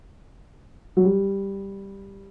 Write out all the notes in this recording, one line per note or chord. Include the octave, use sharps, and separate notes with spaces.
F#3
G3